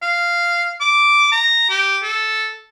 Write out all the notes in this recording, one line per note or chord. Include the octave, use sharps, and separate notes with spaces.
F5
D6
A#5
G4
A4